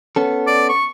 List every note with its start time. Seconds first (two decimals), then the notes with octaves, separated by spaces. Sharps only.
0.16 B3 C#4 A4
0.47 D5
0.69 C#6